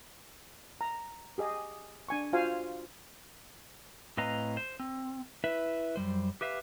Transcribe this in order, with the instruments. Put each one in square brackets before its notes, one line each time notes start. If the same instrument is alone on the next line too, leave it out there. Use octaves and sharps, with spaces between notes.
[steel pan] A#5
G4 G#4 D#5
D4 G#5 C#6
F4 F#4 C5 F5 G#5
[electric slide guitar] A2 C4 B4 D#5 F5 A#5
C5
C4
E4 B4 E5
F#2 G3 C5
G4 B4 E5 F5